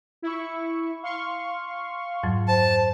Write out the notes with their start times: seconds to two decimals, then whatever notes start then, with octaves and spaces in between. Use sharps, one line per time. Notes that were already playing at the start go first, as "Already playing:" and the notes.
0.22 E4 C#6
1.03 F5 C6 C#6
2.23 F2 G#2 F#3
2.48 C5 A5